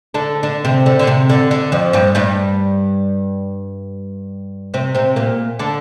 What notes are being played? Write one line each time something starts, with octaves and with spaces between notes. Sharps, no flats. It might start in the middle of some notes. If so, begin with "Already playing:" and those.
D3 D4
D3 D4
C3 C4
D3
D3
C3
D3
D3
F2 F3
G2 G3
G2 G3
C3 C4
C3 C4
A#2 A#3
D3 D4